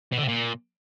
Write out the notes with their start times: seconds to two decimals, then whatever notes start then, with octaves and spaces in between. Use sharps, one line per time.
0.13 B2
0.18 D3
0.23 C3
0.28 A#2